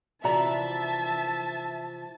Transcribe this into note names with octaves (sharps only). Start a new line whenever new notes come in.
C3 E3 F3 F#4 D5 E5 A5 A#5